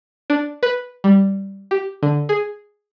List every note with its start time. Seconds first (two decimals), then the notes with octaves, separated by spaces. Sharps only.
0.30 D4
0.63 B4
1.04 G3
1.71 G4
2.03 D3
2.29 G#4